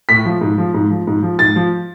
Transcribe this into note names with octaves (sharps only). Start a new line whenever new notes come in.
A2 B6
F3
G#2
F3
G#2
F3
G#2
F3
G#2 A6
F3